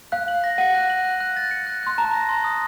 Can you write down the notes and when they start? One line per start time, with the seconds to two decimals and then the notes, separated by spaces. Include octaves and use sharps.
0.12 F5 F#6
0.28 F#7
0.44 A#6
0.58 F#5 D#7
0.75 F#6
0.90 F#7
1.05 F#6
1.20 F#6
1.37 A6
1.51 C#7
1.67 F#6
1.83 C6 F#6
1.98 A5 A#5
2.14 A#6
2.29 C6
2.44 D#6